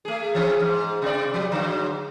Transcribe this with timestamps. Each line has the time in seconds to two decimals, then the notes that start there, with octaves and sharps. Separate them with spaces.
0.05 A3 G#4
0.35 E3 F3 C#4
0.60 G#2
1.02 C3 D5
1.34 F3 G3
1.52 G#2 D3 F#3